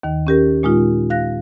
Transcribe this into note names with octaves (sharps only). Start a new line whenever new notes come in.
D#2 D#3
C#4 G4 A#4
A#2 G#3 D#4 F4
F5 F#6 A#6